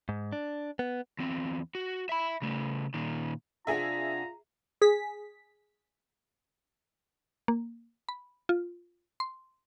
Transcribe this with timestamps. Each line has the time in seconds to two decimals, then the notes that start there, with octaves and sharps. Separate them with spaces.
0.09 G#2
0.32 D4
0.79 B3
1.19 E2 C4
1.75 F#4
2.09 E5 B5
2.42 C#3 A3
2.94 A#2 D#3
3.67 C3 D4 F4 G#4 E5 F#5 A#5
4.81 G#4 B6
7.48 A#3
8.09 B5
8.49 F4
9.20 C6